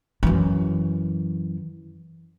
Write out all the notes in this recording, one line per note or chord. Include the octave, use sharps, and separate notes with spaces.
F#2 E3